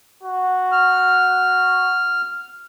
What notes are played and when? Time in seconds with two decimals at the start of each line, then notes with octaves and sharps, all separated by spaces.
0.23 F#4
0.72 F6